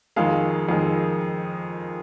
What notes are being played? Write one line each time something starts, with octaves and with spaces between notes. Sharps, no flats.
F2 D#3 G#3 F5
F2 D#3 G#3